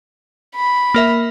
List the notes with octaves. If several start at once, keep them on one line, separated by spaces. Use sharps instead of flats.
B5
A#3 A#4 E5